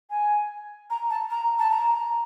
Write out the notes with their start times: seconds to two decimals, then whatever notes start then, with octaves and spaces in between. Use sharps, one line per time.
0.10 G#5
0.90 A#5
1.10 A5
1.31 A#5
1.59 A5
1.71 A#5